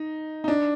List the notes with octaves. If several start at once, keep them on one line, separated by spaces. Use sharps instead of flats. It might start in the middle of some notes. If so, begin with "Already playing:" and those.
Already playing: D#4
D#4
D4